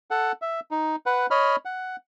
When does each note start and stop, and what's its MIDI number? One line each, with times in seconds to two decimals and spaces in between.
0.11 0.32 69
0.11 0.32 78
0.42 0.60 76
0.71 0.96 63
1.06 1.26 71
1.06 1.26 78
1.31 1.56 73
1.31 1.56 75
1.31 1.56 83
1.31 1.56 89
1.65 1.96 78